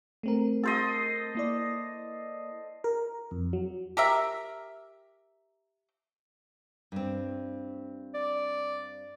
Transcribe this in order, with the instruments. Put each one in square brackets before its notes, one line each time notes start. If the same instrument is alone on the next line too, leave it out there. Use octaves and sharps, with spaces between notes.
[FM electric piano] A3 C4 A#4
[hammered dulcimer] A4 C5 D#5
[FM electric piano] A#3 E4 D5
A#4
F2
F#3
[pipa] G4 A#4 E5
[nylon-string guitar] G2 C4
[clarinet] D5